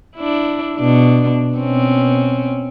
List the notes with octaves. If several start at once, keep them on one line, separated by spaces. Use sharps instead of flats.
D4 E4
B2 D4
B2 C4 C#4